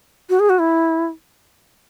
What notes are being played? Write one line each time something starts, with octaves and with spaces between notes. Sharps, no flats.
F#4
G#4
F#4
E4